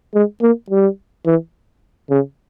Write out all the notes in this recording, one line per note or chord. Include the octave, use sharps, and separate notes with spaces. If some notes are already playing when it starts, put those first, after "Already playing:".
G#3
A#3
G3
E3
C#3